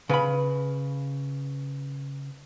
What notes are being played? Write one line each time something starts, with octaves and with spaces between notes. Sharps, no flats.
C#3 B4 B5 D#7